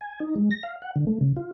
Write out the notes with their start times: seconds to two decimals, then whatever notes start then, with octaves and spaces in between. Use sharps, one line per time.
0.01 G#5
0.20 D#4
0.36 G#3
0.51 A#6
0.63 F5
0.82 F#5
0.96 D3
1.07 A3
1.21 C#3
1.36 F4